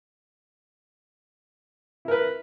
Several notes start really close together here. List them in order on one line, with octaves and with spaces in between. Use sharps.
E4 A#4 B4